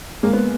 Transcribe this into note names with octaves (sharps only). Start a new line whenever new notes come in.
G#3 A#3
B3